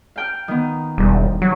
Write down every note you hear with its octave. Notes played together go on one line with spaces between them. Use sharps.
F5 G5 F6
D#3 B3
E1 G3
F#3